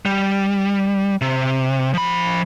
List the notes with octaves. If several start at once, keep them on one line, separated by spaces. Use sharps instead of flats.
G3
C3
F3 B5